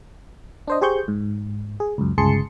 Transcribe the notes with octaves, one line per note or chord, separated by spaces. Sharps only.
D4 C5 D#5
G4 G#4 C5 C#6 G6
G#2
G#4
C#2 F#2
G1 C#2 G#4 A5 C6 C#7